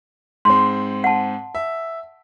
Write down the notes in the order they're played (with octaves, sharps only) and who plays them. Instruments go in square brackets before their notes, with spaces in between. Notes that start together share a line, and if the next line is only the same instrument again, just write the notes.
[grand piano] G#2 C4 [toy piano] C6
[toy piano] F#5 A5
[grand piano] E5